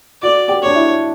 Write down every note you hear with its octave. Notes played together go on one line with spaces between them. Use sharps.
F#4 D5
G4
D4 C#5
E4